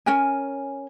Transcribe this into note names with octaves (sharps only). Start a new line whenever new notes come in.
C#4 A#4 G#5